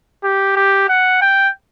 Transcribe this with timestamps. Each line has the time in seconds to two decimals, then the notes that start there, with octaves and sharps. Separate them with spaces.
0.24 G4
0.56 G4
0.89 F#5
1.21 G5